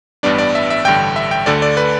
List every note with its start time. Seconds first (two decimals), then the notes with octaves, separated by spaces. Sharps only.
0.23 A1 G2 G3 B3 D4 D5
0.38 D5
0.55 E5
0.70 E5
0.85 A1 G2 D3 G5
1.16 E5
1.31 G5
1.46 D2 D3 A3 D5
1.62 D5
1.77 B4